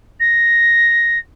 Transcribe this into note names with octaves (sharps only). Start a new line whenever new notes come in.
A#6